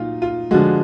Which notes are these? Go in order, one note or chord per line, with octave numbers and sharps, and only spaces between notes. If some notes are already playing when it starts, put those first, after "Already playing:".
Already playing: A#2 F#3 D#4 F4
F4
D3 F3 G#3 F#4